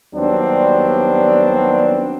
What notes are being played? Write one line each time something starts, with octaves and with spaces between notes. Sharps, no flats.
D#2 F#3 G3 B3 C4 D4